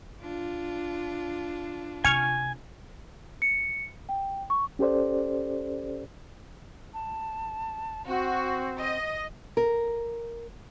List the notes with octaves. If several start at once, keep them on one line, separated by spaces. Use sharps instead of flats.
D4 F4
C3 G#5 C#6 F6 G#6
C#7
G5
C#6
C#4 G4 A4 C5 D5
A5
C4 F#4
D#5
A#4